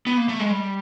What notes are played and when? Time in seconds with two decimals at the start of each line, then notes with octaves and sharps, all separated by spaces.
0.07 B3
0.17 A#3
0.29 A3
0.39 G#3
0.50 G3